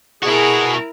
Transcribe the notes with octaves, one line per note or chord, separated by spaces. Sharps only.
B2 E4 F#4 G#4 A#4